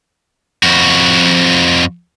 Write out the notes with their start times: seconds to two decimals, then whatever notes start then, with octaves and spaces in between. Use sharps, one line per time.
0.63 F2 F#4